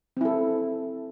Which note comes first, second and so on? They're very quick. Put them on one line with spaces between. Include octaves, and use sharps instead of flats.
C4 E4 A4